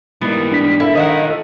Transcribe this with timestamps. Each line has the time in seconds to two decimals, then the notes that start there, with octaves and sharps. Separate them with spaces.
0.21 G#2 E3 G3 A#3 B3
0.53 D4 B6
0.80 E4 A4 A#4 F5
0.95 D#3 E4 D#5 E5 F#5
1.25 A4 D#5